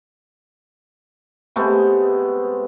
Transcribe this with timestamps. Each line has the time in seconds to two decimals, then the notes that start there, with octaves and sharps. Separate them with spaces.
1.56 C3 G#3 A3 B3